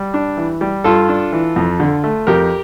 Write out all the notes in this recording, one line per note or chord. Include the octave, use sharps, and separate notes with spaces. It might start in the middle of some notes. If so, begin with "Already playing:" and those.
Already playing: G3
D4
E3
G3
G2 F4 A4
D4
E3
F2
D3
A3
F2 G4 A#4